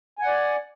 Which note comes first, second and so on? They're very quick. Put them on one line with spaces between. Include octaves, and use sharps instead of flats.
G#5 F#5 D5